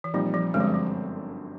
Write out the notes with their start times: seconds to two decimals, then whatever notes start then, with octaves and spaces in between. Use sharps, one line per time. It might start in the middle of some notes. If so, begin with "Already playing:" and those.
0.04 E3
0.14 A#2 F3 G3 C4 D#4
0.34 F3
0.54 G1 F#2 D3 G3 G#3 C4
0.60 F3
0.64 F#3
0.74 F3